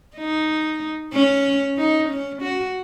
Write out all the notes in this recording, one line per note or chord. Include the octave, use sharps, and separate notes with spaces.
D#4
C#4
D#4
C#4
F#4